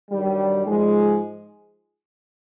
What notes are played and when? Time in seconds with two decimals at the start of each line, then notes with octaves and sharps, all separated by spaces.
0.11 G2 D#3 F#3 G3
0.66 G#2 F3 G#3